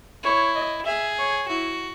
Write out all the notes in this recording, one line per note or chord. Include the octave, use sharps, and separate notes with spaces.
E4 C#5
D#5
G#4 E5
C#5
E4 F#4